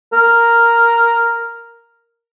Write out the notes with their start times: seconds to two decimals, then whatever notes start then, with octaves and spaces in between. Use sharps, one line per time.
0.13 A#4